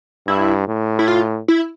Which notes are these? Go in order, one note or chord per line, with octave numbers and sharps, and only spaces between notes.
G2 E4
A2
E4
F4
E4